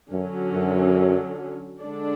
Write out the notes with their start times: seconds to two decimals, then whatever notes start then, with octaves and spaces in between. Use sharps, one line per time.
0.12 F#2 D3 F#3 C#4
0.54 F#2
1.81 D3 G#3 D4 A4 D5